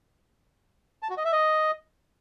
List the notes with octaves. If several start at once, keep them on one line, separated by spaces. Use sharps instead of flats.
A5
F#4
D#5
E5
D#5